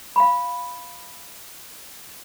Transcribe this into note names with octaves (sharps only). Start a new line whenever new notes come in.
F5 B5